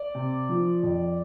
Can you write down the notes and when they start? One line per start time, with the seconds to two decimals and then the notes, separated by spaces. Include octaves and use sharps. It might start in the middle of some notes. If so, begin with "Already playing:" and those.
Already playing: D5
0.15 C3
0.49 F3
0.83 F2